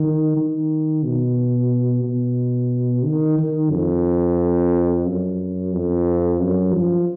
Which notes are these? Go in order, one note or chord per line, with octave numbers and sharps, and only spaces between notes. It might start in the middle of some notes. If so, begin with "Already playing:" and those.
Already playing: D#3
D#3
B2
B2
D#3
D#3
F2
F#2
F2
F#2
F3